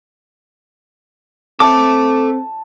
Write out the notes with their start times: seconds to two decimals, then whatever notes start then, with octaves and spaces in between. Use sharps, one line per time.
1.60 C4 A4 E5 A5 D6